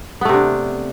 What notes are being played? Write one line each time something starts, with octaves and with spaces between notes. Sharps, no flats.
C3 A3 B3 D4